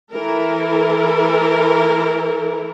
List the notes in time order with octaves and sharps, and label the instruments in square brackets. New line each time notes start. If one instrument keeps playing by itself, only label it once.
[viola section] E3 E4 A4 A#4